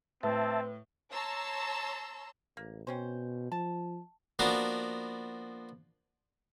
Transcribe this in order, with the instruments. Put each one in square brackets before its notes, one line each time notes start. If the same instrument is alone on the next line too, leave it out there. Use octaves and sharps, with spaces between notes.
[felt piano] A2 [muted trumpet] C4 [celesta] B4 [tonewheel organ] E5 A5
[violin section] C#5 A5 A#5 C6 E6
[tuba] A1 [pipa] A#3
[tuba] B2 [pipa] C4 C#4 C5
[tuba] F3 [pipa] A5
[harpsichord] F3 A#3 B3 D4 F#4